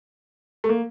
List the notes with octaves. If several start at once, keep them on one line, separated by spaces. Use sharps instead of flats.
A3
A#3